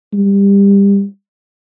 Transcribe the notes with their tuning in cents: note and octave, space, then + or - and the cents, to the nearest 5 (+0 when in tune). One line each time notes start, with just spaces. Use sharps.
G3 +25